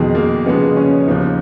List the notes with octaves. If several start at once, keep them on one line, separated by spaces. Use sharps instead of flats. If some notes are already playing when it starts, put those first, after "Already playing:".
Already playing: F2 B2 D#3 G#3
A#3
C#3 F3 G#3 B3
C#4
D#2 C#3 F3 B3 D#4